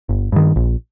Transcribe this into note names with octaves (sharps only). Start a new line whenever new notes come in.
G1
G2 D#3
A#1